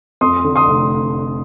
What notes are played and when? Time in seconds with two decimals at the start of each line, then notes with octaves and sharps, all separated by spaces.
0.21 F2 C6 D#6
0.44 D3
0.56 C6 D#6
0.68 F1